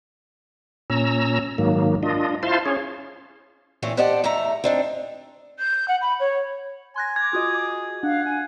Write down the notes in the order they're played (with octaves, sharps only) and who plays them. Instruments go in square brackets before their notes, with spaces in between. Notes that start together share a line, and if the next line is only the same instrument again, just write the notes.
[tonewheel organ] A#2 C#4 A#5 E6
G#2 D#3 F#3 A#3
D4 F4 D#5
E4 F4 C5 F5 A5 C6
C#4 G#4 C#5
[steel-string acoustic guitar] A#2 E3 A3 C4 C#4
G4 C5 D5 D#5 F#5 A5
E2 A3 E5 A#5
C4 D4 D#4
[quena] G6
F#5
B5
C#5
[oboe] G#5 [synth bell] C6 F#6 A#6
[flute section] D6 [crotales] G#6
[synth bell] F4 F#4 D#5 [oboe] G#4
[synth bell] D4 [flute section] F5 [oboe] F#5
[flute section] G#5